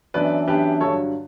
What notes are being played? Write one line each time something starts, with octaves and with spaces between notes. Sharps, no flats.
F#2 E3 B3 D4 B4 D5
F#2 E3 B3 D4 G4 B4
G2 D3 F#3 A4 C#5